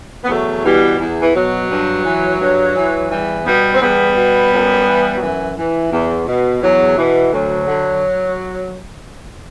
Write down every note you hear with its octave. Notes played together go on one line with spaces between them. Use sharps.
B3
E2 F#3 A3
B2 E3 G3
E2
E3
B2 F#3
G2
E3
G2
E3
E2 E3 G3
B2 G3 B3
C4
E2 G3 B3
B2
F#2
E3
F#3
F#2 E3
E3
E2
B2
E2 F#3
B2 E3
D2 F#3
D3